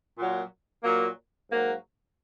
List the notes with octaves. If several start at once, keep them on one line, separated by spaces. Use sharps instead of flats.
A#2 F#3
A#2 F#3 A#3
G#2 F#3 A#3